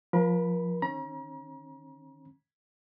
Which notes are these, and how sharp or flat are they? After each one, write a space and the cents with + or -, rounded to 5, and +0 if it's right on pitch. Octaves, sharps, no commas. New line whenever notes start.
F3 +10 A#4 +40 B5 +0
D#3 -35 C#4 -35 A#5 +40